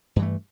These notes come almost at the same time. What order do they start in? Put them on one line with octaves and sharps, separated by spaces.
G2 E3 A3